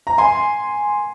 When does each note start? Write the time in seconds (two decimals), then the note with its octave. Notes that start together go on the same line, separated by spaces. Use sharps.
0.07 A#5
0.18 G#5 C6